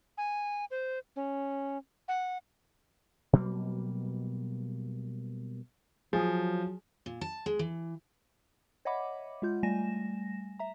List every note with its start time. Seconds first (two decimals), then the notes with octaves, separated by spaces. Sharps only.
0.18 G#5
0.71 C5
1.16 C#4
2.08 F#5
3.33 B2 F#3 G3 A#3
6.13 F3 F#3 G#4
7.06 A#2
7.21 A5
7.46 G#3
7.59 E3
8.85 C#5 D#5 E5 F#5 B5 D6
9.42 G#3 F4 G6
9.63 G3 A3 G#5 A#6 E7
10.59 E5 A#5